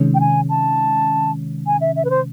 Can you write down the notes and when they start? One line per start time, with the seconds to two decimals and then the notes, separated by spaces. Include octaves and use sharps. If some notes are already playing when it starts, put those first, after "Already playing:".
Already playing: C3 D#3 G#3 C#4
0.15 G5
0.20 G#5
0.50 A5
1.67 G#5
1.81 E5
1.96 E5
2.05 B4
2.10 C5